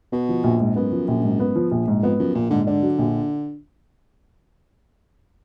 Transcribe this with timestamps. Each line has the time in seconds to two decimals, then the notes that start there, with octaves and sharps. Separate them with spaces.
0.12 B2 B3
0.29 F3
0.44 A#1
0.60 G#2
0.76 F#2 B3
0.92 F3
1.08 A#1
1.24 G#2
1.40 B3
1.55 F3
1.71 A#1
1.88 G#2
2.02 F2 B3
2.19 F#2 F3
2.35 A#1 A#2
2.50 G#2 D3
2.67 D3 D4
2.82 F#3
2.99 A#1